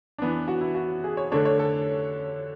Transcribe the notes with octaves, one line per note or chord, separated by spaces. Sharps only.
E3 B3 D4
F#4
E4
F#4
G#4
C#5
D3 A3 D4 C#5
C#5
A4